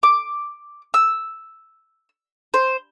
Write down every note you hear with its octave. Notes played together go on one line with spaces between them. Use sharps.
D6
E6
C5